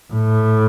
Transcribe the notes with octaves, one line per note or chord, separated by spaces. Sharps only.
A2